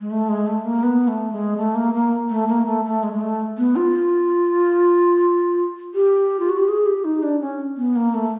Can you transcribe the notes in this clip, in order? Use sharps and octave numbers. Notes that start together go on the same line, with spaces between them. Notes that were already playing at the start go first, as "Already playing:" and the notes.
G#3
A3
G#3
A3
A#3
B3
A3
G#3
A3
A#3
A#3
A3
A#3
A3
A3
G#3
G#3
A3
B3
F4
G4
F4
F#4
G4
G#4
G4
D#4
D4
C#4
B3
A#3
A3